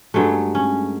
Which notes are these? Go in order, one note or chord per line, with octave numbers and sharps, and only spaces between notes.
G2 F#3 G#3 A3
C#4